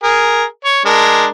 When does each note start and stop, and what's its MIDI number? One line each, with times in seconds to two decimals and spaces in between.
0.03 0.44 68
0.03 0.44 70
0.64 0.81 73
0.85 1.26 56
0.85 1.26 62
0.85 1.26 70